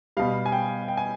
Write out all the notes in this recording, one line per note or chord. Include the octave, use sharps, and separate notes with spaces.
B2 G3 F5
G#5
G5
G5
G#5